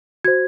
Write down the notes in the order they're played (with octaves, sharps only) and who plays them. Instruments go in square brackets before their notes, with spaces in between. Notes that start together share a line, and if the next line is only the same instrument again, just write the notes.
[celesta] F#4 C5 G#6